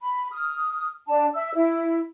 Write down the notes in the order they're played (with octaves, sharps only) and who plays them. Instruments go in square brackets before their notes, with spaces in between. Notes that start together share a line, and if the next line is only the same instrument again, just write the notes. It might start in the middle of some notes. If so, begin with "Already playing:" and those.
[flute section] B5
D#6 F6
D4 A5
E5 E6
E4